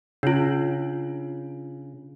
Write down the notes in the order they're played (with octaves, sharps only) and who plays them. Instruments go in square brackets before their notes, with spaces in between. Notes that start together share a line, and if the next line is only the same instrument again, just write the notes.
[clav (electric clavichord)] C#3 [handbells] D4 F4